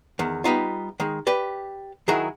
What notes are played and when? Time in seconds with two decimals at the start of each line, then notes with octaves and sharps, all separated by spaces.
0.19 E2 D#3
0.44 G3 B3 D#4 F4
1.00 D#3 G#3
1.27 G4 B4 D5
2.08 D#3 F#3 G#3 E4 G#4 A#4